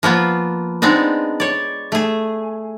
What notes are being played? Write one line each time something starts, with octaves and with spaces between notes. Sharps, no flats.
F3 A#3 B3 F4
G#3 B3 C4 D4 D#4
C#5 D5
A3 G#4